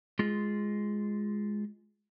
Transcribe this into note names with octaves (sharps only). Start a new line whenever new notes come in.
G#3 F4 G#4